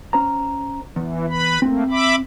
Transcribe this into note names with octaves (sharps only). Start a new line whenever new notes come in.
C#4 C5 A#5
E2 E3
B4 B5
A3 A#3 C4
E5 B5 D6